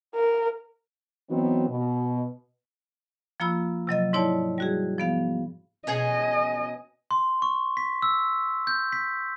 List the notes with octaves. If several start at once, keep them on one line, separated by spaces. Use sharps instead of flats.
A#4
E3 F#3 B3 C4 D#4 F#4
B2
F3 A#3 F4 B5 E6
C3 F#3 D#5 A6
G#2 D#4 E4 C#5 D5 A5
G3 F#4 G#4
F3 B3 F5
B2 C#4 G#4 D#5
C6
C#6
B6
E6
G6
B6